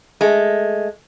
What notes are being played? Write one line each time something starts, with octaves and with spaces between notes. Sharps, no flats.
G#3 A3